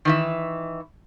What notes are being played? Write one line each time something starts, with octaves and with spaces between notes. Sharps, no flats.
D#3 E3 E5